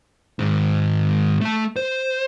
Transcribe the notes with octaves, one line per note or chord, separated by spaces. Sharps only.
G#2 D#3
A3 A5
C5